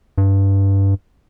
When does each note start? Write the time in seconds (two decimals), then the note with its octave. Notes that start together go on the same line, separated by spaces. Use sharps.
0.18 G2